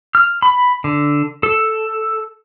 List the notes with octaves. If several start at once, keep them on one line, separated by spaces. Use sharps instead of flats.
F6
B5
D3
A4